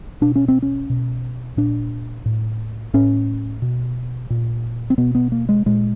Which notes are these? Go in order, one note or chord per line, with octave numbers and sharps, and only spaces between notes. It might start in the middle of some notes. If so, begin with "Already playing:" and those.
B2 D4
C#4
C4
C#4
B2
A#2 D4
A2
A2 C#4
B2
A#2
C4
B2 B3
B3
A#3
G#3
A#2 G#3